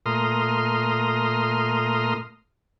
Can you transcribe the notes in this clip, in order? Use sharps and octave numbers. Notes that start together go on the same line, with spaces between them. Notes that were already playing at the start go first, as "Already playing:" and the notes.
A#2 A3 A#5 C6 D#6 F6